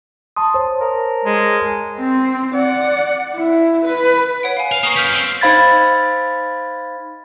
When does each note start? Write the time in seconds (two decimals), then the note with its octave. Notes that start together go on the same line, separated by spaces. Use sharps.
0.36 A5 C6 D#6
0.54 C5 C#5 A5
0.81 A#4
1.25 G#3
1.99 C4
2.54 D5 F#5
3.34 E4
3.84 B4
4.43 C#5 F#5 D7
4.57 F5 G#5
4.72 B4 F5
4.83 A#3 C#6 D#6
4.96 F#3 C#4 F6 G6 B6
5.13 C4
5.41 D#4 C5 F5 B5 G#6 A6